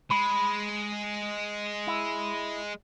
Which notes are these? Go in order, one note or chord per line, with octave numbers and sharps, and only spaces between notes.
G#3 B5
E4